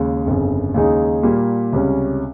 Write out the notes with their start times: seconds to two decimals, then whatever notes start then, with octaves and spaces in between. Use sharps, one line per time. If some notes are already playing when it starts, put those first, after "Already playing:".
Already playing: D#2 C#3 G#3
0.26 G1 F2 C#3
0.74 D#2 C#3 G#3 D#4 G#4
1.23 A#2 G3 A#3
1.73 C#2 C3 G3 C#4